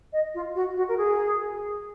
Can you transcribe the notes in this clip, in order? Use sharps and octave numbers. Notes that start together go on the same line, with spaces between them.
D#5
F4
F#4
F#4
A#4
G#4